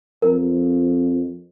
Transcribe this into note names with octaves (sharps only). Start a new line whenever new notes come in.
F2 A#4